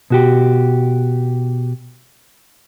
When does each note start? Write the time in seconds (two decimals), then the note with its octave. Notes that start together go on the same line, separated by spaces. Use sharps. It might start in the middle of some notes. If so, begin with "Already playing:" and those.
0.10 B2 F#4 G4